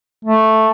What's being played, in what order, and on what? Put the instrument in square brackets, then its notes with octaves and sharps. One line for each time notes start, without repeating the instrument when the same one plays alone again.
[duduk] A3